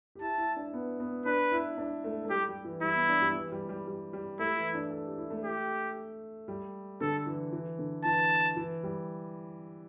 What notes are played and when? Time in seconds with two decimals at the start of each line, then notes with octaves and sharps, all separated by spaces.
0.15 G4
0.21 E4 A5
0.38 E4
0.56 D4
0.73 B3
1.00 B3
1.26 D4 B4
1.52 E4
1.78 D4
2.04 A3
2.25 A3
2.30 G3 G4
2.48 G3
2.65 E3
2.82 G3 E4
2.95 B3
3.09 D4
3.22 G3
3.35 E3
3.52 G3
3.69 G3
3.87 G3
4.13 G3
4.39 A3 E4
4.57 E3
4.75 D4
4.91 A4
5.04 G4
5.18 E4
5.30 A3
5.44 G4
6.48 G3
7.01 D3 A4
7.26 E3
7.52 E3
7.78 D3
8.04 E3 A5
8.56 E3
8.83 G3